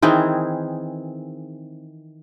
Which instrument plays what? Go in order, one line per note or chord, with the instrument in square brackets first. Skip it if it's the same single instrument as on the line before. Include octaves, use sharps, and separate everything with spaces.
[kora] D#3 E3 C4 G#4